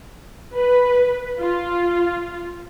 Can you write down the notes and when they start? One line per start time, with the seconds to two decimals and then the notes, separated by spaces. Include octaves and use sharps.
0.55 B4
1.40 F4